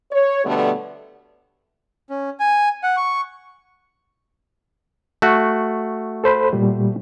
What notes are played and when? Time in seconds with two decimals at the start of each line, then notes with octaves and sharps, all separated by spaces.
0.12 C#5
0.45 B2 D3 G3 A3 B3
2.10 C#4
2.40 G#5
2.83 F#5
2.97 C#6
5.22 A3 F#4
6.24 A4 C5 B5
6.53 A#2 G3